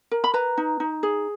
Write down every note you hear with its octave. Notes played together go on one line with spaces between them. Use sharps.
A#4
B5
B4 A#5
D#4
D#4
G#4